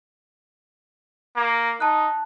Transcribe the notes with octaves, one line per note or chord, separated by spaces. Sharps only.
A#3
D#4 A5 F#6